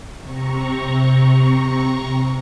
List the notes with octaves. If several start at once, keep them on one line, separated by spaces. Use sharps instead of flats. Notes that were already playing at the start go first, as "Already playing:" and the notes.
C3 C4 A#5 C#6